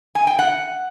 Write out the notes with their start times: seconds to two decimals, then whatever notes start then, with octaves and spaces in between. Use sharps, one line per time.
0.15 G#5
0.27 G5
0.39 F#5